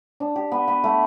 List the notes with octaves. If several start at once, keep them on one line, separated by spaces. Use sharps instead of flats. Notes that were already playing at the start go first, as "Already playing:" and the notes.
D4
G4
B3
B3
A3